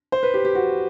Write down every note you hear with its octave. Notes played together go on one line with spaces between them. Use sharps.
C5
B4
G4
G4
F#4